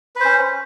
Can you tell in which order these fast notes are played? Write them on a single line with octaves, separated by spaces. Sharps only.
B4 C5 C#4